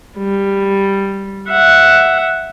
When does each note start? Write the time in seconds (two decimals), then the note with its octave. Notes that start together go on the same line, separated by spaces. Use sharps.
0.18 G3
1.49 E5 F#5